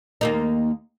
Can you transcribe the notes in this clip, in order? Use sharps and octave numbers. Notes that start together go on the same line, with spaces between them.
D#2 A#3 D#4